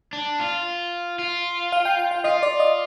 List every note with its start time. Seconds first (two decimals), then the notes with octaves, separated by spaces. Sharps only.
0.13 D4
0.40 F4
1.19 F4
1.72 F5
1.85 G5
1.99 G5
2.11 F5
2.24 F4 D#5
2.43 D5
2.60 D#5